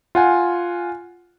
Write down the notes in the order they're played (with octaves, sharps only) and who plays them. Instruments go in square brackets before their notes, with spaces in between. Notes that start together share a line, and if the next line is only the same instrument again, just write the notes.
[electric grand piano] F4 F#5 G#5